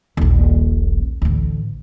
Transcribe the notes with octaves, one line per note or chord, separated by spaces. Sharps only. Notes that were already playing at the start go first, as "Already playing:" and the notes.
D#1 A#1
A1 D2